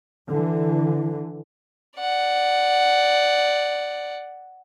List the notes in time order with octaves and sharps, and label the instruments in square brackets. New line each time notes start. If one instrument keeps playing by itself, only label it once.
[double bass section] D3 E3
[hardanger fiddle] D5 F#5